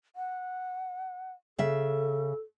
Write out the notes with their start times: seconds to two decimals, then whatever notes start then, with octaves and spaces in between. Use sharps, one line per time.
0.16 F#5
1.59 C#3 A4 E5